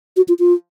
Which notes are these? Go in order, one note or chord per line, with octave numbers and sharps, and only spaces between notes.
F#4
F4
F4